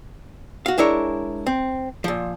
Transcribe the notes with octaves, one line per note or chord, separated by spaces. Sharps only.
F#4 F5
G#3 D4 E4 A#4 C#5
C4
A#2 F3